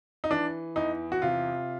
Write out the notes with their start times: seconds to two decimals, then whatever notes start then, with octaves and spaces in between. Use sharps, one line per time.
0.24 D#4
0.31 E3 D4
0.76 E2 D#4
1.12 F#4
1.22 C3 F4